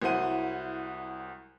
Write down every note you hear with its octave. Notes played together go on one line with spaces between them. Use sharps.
C2 F#3 E4 C5 F#5 D#7